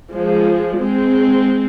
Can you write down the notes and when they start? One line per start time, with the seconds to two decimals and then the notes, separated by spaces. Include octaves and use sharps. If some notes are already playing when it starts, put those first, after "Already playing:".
0.11 F3 G#3
0.79 G#3 C4